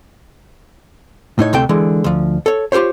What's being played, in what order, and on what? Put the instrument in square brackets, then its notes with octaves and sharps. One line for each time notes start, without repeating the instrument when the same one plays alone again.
[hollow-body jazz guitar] A2 D#4 C#5
D2 C3 A3 G5
D3 E3 G#3
D2 F3
A4 C#5
F4 G4 A#4 C5 C#5